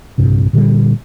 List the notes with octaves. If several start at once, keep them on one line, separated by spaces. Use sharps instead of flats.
A#1 G2 C3
A#2 D3 F3 G3